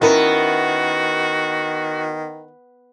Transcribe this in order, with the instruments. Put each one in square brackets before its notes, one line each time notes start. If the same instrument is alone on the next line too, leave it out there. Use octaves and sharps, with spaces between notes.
[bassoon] D#3 [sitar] B3 [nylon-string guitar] C#4 E4 A#4 [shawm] F#4